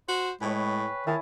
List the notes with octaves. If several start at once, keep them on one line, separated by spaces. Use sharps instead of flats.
F#4 C5
A2 G#3 B4 C#5 G5 G#5
D#3 E4 G#5 A5